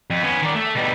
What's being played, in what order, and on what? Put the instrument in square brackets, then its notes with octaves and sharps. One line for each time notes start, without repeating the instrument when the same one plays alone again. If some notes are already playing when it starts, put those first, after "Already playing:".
[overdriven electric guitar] F2
B3 C#4
D#3 D5
A3
B2 G3